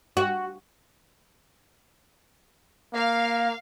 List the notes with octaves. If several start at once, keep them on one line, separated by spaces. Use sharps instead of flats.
F#4
A#3 F5